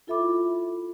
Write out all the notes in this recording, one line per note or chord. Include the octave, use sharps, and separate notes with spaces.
E4 F4 A4 E5 B5 D6